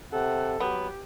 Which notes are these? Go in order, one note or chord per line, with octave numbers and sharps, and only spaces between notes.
C3 A4 F#5
F#3 B3 G4